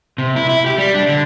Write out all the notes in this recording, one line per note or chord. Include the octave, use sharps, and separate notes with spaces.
C3
E4
E4
G4
G3
D4
D3